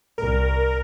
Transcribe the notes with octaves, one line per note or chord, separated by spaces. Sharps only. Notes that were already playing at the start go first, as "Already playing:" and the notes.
C2 A#4